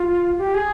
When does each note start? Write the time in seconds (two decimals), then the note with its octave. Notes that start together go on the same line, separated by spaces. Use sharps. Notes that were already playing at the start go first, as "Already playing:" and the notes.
Already playing: F4
0.38 G4
0.54 G#4